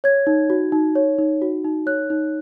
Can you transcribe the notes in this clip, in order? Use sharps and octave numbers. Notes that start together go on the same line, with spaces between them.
C#5 G#6
D#4
F#4
D#4
C#5
D#4
F#4
D#4
C#5 F#6
D#4